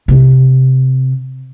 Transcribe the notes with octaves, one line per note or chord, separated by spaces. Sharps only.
C3